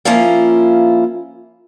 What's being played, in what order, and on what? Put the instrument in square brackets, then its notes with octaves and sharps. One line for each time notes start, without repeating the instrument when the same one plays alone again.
[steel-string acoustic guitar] F3 A#3 C#4 E4 F4